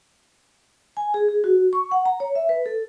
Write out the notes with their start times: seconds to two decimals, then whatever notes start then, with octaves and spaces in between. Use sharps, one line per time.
0.97 G#5
1.14 G#4
1.29 G#4
1.44 F#4
1.73 C#6
1.91 F#5
2.06 A#5
2.20 C#5
2.35 E5
2.49 B4
2.66 A4